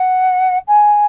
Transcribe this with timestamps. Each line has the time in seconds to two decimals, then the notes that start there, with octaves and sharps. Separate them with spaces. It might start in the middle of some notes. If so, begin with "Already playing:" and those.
Already playing: F#5
0.67 G#5